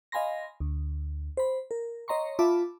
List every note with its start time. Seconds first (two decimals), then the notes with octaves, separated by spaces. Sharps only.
0.12 D#5 F5 G#5 B5 C6 A#6
0.60 D2
1.37 C5 B5
1.71 A#4
2.08 C#5 D#5 A#5 C6 C#6
2.39 F4 E5 A5 B5 D6